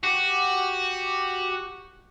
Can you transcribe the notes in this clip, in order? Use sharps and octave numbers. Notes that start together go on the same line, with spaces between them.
F#4 G4